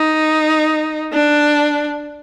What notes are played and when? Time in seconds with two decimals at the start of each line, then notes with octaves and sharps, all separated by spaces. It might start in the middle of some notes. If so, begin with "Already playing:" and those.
Already playing: D#4
1.12 D4